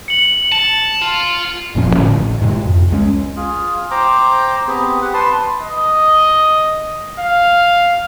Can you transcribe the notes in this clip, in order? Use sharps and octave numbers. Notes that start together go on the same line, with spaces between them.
C#7 F#7
A5
F4
F#1 A#2 F3 C#4
A2 D3
A1
G#2 C3
F2
C#2 G#3 C#4
F4 G#4
C5 G5 A#5 D6
B3 C4 G4 G#4
G4 F#5
B4 A5 C6
D#5
F5